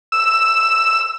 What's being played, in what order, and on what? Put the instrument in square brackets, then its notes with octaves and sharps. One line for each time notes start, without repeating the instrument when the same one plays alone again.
[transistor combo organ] E6